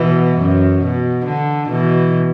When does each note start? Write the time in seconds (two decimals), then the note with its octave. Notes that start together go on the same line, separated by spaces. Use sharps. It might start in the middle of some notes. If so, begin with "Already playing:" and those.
Already playing: B2 E3
0.38 F#2
0.82 B2
1.25 D3
1.69 B2 E3